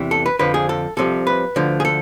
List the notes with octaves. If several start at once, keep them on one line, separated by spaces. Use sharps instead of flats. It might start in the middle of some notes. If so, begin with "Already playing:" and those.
Already playing: E2 C3 E3
A4
B4
F2 D3 F3 B4
G#4
A4
C2 C3 F3 A4
B4
D2 D3 F3
G#4
A4